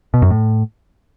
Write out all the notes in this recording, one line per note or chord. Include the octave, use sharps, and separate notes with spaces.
B2
F#2
A2